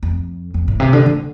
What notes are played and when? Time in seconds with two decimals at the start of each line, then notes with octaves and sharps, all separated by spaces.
0.03 F2
0.54 F2
0.68 A2
0.80 C3
0.93 D3
1.06 D3